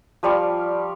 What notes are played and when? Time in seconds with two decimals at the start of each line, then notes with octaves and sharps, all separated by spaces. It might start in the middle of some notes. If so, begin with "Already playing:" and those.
0.23 F3 G3 F5 C#6